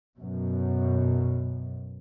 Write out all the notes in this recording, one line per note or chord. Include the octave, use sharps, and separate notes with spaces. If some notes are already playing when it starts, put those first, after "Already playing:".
F#2 B2